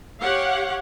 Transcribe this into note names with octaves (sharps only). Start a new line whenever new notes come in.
G4 C#5 F5 F#5